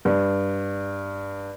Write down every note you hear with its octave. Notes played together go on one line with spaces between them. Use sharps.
G2